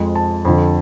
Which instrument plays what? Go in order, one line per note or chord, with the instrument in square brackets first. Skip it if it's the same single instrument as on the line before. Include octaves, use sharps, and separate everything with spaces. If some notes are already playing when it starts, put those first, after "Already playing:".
Already playing: [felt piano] F2 F3 G#3
A5
F2 D3 F3